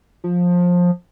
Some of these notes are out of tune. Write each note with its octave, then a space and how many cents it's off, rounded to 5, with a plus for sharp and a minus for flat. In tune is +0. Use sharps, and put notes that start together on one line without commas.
F3 +20